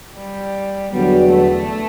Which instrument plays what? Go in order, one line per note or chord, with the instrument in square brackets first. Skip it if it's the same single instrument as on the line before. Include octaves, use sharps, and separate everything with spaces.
[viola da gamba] G3
[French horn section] E2 D3 F#3 B3 F#4 [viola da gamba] G3
[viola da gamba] A3